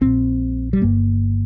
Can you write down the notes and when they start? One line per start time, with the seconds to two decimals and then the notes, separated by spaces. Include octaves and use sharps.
0.01 A#1 A#2 C4
0.73 G3
0.82 G1 G2 A#3